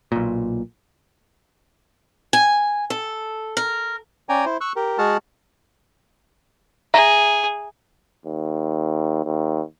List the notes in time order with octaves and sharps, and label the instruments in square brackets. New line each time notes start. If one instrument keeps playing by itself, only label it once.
[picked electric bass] B1 A#2
[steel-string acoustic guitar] G#5
A4
A#4
[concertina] C#4 D5 G5 G#5 A#5
E4 C5
C#6 E6 F#6
G4 A#4
G#3 F#4 G#4 F#5 A5 F6
[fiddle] G#4 [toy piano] E5 A#5
[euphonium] D#2
D#2